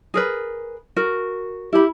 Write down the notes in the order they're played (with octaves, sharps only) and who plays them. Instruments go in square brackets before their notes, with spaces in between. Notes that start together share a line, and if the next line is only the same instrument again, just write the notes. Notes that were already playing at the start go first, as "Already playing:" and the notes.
[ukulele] G#4 A#4 B4
F#4 A#4
[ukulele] E4 B5 [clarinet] G4